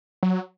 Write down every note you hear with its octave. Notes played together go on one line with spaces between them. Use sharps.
F#3